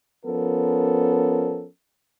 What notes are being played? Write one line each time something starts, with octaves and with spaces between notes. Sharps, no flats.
F3 B3 C#4 A4 A#4